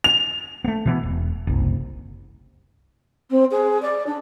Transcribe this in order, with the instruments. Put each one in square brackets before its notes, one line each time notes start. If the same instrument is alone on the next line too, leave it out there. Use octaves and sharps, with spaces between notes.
[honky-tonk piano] F7
[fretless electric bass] A3 B3
B2 E3 B3
E1
F#1 C2
[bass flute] C4
G#4
D5
D4